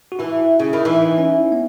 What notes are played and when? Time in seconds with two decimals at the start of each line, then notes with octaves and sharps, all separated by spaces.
0.12 F#4
0.19 E3 E4
0.59 C#3
0.73 D#3 E4
0.85 E3 D#4
1.18 C#4
1.52 B3